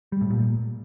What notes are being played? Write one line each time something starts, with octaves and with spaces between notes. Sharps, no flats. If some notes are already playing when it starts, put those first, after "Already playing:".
G3
A2
A#2